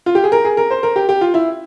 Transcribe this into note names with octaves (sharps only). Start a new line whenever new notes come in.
F4
G4
G#4
A#4
G#4
A#4
C5
A#4
G4
G4
F4
E4